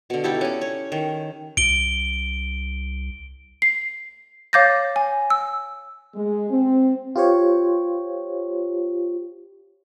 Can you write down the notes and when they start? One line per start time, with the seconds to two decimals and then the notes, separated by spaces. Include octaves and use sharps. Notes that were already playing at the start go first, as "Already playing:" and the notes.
0.10 B2 D3
0.24 D#4 E4 G4 A4
0.41 C#4 D5
0.61 C#5
0.92 D#3
1.57 C2 D7 G7
3.62 C7
4.53 C#5 F5 D6 G6 A6 A#6
4.96 G#5
5.30 E6
6.15 G#3
6.51 C4
7.16 F4 G4 C5 C#5